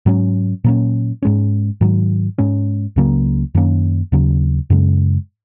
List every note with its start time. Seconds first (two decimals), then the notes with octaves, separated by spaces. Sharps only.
0.06 G#2 F#3 C#4
0.64 A#2 F#3 A#3 C#4
1.23 G#2 G#3 C#4
1.81 G#2 D#3 F#3
2.38 G#2 G#3 C#4
2.96 C#2 C#3 F#3 A#3
3.55 F#2 D#3 A#3 C#4
4.12 D#2 C#3 F#3
4.70 F#2 C#3 G#3